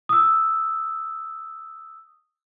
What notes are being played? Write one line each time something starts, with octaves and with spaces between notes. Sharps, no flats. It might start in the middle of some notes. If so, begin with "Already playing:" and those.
D#6 E6